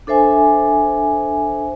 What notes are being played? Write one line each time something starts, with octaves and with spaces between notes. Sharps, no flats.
D4 A4 C5 E5 G#5